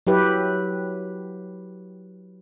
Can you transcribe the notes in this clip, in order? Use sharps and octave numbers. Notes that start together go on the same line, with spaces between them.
F#3 E4 G4 B4